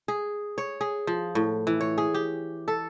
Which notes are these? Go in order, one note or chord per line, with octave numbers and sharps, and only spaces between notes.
G#4
C#5
G#4
F3
A2
E3
C#5
G#4
G4
A4